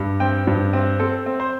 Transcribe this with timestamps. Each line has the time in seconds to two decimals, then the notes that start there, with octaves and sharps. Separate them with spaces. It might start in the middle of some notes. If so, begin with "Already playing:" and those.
Already playing: G2
0.20 C4 G5
0.47 G2
0.73 C4
1.00 C4 A4
1.26 C4
1.40 C5